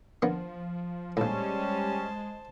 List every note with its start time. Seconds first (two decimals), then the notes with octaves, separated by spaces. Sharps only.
0.22 F3 A#3 B3 D4
1.17 A#1 A2 G3 G#3 C#4 C5 A5